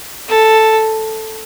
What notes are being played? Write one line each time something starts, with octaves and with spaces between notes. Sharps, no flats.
A4